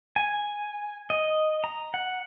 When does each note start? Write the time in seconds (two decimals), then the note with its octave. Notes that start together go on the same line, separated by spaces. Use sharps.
0.16 G#5
1.10 D#5
1.64 A#5
1.94 F#5